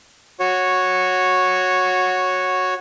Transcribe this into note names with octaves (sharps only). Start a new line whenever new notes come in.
F#4 C#5